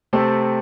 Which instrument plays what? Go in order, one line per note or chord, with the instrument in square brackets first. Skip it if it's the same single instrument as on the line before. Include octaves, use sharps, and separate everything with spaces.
[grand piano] C3 A3 C4 A4